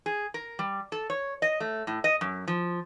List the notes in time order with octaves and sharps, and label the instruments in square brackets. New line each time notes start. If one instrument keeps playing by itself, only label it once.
[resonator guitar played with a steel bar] G#4
A#4
G3
A4
C#5
D#5
A3
A2
D#5
F#2
F3